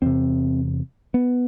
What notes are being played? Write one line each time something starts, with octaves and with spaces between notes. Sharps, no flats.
E2 C3 C4
B3